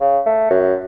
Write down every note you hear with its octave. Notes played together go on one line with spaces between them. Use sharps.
C#3
A3
F#2